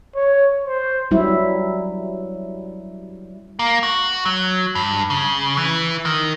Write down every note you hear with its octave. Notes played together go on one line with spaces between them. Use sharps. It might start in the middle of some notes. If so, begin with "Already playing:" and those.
C#5
C5
F#3 G3 E4
A#3
F#4
F#3
G2
C#3
E3
D#3